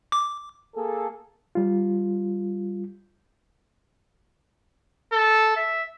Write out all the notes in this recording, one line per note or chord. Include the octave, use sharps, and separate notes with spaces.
D6
A#3 G#4 A4
G3 F4
A4
E5